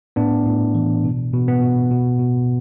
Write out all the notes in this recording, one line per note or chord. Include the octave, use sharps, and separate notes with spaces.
A2 B3 D4
A2
E3
B2
B2
B3
B2
B2
B2